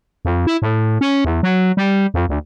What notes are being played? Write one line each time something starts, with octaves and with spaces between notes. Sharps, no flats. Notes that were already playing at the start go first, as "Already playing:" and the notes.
F2
E4
A2
C#4
E2
F#3
G3
F2
D2